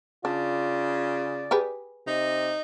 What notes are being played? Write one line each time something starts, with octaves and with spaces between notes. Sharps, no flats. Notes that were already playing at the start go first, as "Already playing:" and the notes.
C#3 D4 F4 D5
G4 G#4 B4
C3 D#4